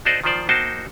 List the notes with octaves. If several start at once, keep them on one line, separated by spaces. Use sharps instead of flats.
D#4 F#4 A4 C5 D5 D#5
D#3 F3 F4 C5 D5
A#3 D#4 F#4 C5 G5 A5